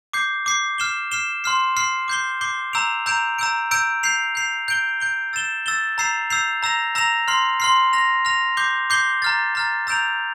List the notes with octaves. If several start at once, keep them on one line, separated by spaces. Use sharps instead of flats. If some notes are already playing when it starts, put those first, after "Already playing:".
D6 G6 C7
D6 G6 C7
F6 C7 E7 G7
F6 C7 E7 G7
C6 F6 C7
C6 F6 C7
D6 G6 C7 G7
D6 G6 C7 G7
A#5 E6 G6 D7 F7
A#5 E6 G6 D7 F7
A#5 E6 G6 D7
A#5 E6 G6 D7
G6 C7 F7
G6 C7 F7
G6 D7 G7
G6 D7 G7
E6 A6 E7 G7
E6 A6 E7 G7
A#5 E6 G6 C7 F7
A#5 E6 G6 C7 F7
A#5 E6 A#6 F7
A#5 E6 A#6 F7
C6 F6 C7
C6 F6 C7
F6 A#6 F7
F6 A#6 F7
D6 G6 C7 G7
D6 G6 C7 G7
A#5 F6 A6
A#5 F6 A6
A#5 E6 G6 D7 F7